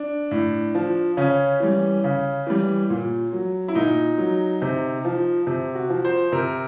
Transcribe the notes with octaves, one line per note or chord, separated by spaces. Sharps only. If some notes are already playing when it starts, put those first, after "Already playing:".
Already playing: D4
A2
F3
C#3 C#4
E3 G3
C#3
E3 G3
A#2
F#3
E4
A#2 D#4
F#3
C3
F3
C3
F#4
F3
C5
C3 A#4